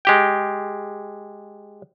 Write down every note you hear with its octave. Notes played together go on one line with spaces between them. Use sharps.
G#3 G4 G5